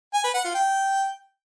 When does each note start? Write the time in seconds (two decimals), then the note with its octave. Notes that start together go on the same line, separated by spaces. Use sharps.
0.14 G#5
0.24 B4
0.34 F#5
0.44 F4
0.55 G5